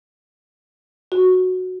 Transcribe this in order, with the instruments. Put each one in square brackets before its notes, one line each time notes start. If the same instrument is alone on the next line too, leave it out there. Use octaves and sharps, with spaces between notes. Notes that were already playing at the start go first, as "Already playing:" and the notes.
[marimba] F#4